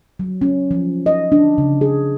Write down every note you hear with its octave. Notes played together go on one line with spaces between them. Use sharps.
F#3
C#4
F3
D#5
D4
C#3
G#4